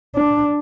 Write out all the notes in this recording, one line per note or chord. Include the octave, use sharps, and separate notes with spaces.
D4